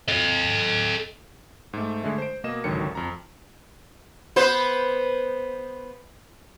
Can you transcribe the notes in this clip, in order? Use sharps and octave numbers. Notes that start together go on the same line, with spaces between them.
A4 D#5
G#2 A3
D3 G#3 A3
C5 D7
B2 A#3 D#5 E7
G#1 C#2 D3 D#3 F#3 C#7
F2 A#5
B3 C5